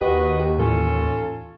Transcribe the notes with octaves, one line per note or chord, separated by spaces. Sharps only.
D#2 F#4 G4 B4 D#5
G4
A2 E3 C#4 F4 A4